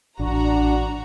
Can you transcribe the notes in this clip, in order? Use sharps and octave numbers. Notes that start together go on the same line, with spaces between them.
A1 D4 F#4 A#5